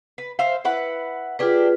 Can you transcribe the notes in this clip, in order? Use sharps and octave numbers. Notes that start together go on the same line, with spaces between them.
B4
C5 E5 F5
E4 B4 F#5
D4 F4 G4 G#4 B4